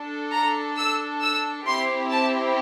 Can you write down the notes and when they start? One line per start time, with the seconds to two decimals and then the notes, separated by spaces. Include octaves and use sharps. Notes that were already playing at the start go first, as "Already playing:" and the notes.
Already playing: D4 A4
0.32 A#5
0.77 E6
1.21 E6
1.66 C4 E4 G4 C6
2.10 A5